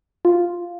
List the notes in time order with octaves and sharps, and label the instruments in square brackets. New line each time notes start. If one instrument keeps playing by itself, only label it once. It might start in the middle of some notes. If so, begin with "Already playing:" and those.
[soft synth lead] F4